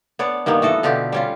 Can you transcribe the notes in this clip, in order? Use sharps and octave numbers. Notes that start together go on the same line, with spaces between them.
B3 D4 C#5 D5
G2 D#3 A#3 B3
E3 F#4 A4 D#5
B2 D3 F4 G4
G3 C#4 F4